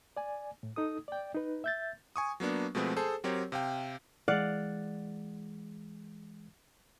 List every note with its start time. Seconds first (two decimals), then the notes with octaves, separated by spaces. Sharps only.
0.17 D5 G#5
0.63 A2
0.76 D#4 A4 D#6
1.08 D5 G5
1.35 D#4 B4
1.64 E5 G6 A6
2.16 G#5 C#6 D#6
2.40 F#3 A#3 B3 D4
2.75 B2 F3 G#3 A3 B3 C4
2.96 G#4 A4 C5 A5
3.24 F#3 C4 G4 A#4 C#5
3.52 C3 F5 G5
4.28 E3 G#3 D5 F5 F#5